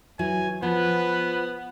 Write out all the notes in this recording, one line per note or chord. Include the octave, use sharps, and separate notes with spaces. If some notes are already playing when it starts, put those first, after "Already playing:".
E3 F#3 E4 G#5
F3 B3 B4